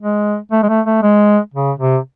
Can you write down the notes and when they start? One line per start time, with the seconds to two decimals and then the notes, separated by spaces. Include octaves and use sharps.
0.01 G#3
0.52 A3
0.63 G#3
0.69 A3
0.86 A3
1.03 G#3
1.54 C#3
1.79 C3